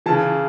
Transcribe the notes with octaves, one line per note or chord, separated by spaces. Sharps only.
C#3 E3 A5